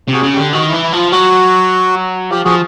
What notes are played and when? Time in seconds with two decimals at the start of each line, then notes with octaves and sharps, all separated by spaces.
0.08 C3 F#4 G#4
0.23 C#3
0.34 D3 G4
0.53 D#3 F#4
0.68 E3 E4
0.82 E4
0.93 F3 F4
1.12 F#3 F#4
2.31 F3 G4
2.45 F3 F#4 G#4